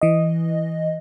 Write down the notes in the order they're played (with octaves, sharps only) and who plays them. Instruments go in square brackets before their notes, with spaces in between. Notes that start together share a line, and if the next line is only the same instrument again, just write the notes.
[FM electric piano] E3 D#5